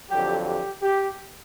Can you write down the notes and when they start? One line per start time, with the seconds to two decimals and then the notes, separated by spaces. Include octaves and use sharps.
0.10 F2 D3 F#3 G4
0.46 G4
0.82 G4